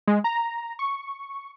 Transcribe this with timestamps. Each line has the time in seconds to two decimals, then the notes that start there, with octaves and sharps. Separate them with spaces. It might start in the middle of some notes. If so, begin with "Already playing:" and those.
0.08 G#3
0.24 A#5
0.79 C#6